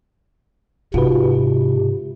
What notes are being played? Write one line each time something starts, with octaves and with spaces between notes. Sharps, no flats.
G#2 C3 F4 F#4 B4